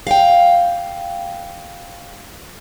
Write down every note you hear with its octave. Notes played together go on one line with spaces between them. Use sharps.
F5 G5